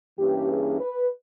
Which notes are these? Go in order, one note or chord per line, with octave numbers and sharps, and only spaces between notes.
G2 E3 A#3 C#4 G4
G#4
B4